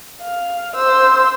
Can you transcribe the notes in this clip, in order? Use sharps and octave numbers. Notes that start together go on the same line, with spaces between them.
F5
C5 E6